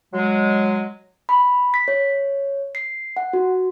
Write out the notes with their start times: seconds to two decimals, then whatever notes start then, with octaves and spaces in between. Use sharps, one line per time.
0.13 F#3 G#3
1.29 B5
1.74 B6
1.88 C#5
2.75 C7
3.17 F#5
3.33 F#4